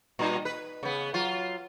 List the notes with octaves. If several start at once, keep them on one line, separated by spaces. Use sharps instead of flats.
A#2 G3 D#4
B4
C#3 B3
F#3 F4